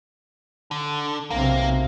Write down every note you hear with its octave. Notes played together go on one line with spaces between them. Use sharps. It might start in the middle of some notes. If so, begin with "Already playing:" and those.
D3
B1 C3 A#3